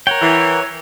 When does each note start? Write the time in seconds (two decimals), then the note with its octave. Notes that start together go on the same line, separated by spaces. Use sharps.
0.07 A#4 C#5 F#5 G5
0.22 E3